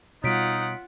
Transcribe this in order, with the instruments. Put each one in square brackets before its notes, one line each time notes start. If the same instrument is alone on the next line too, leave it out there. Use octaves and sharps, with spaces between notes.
[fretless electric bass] B2 G3 [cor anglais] D#4 [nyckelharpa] F4 F#5 [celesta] C#5 B6 D7